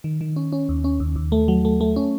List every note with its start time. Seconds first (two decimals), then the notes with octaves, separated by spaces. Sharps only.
0.04 D#3
0.21 D#3
0.36 C#4
0.52 C#4
0.69 D#2
0.84 C#4
1.00 D#2
1.16 D#2
1.32 A3
1.48 F#3
1.65 A3
1.81 A3
1.96 C#4